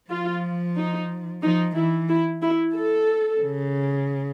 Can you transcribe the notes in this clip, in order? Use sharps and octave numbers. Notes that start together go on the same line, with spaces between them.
F3 F4
D#4
F3 D#4
E3 E4
E4
E4
A4
C#3